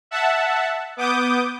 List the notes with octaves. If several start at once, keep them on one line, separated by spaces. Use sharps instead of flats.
E5 F#5 A5
B3 D6 D#6 G6